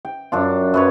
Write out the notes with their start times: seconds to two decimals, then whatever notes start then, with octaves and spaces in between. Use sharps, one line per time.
0.05 G5
0.32 F#2 D4 F4
0.74 F#2 B4 C#5